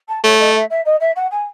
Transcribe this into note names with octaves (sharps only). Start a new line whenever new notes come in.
A5
A3 C#5
D#5
E5
E5
D#5
E5
F#5
G#5